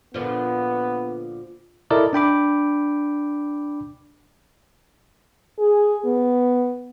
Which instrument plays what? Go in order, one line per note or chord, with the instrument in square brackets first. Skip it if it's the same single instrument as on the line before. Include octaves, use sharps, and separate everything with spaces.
[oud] A#2 D3 F3 [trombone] B3
[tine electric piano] E4 A4 A#4 D5 D#5
D4 G5 B5 D6
[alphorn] G#4
B3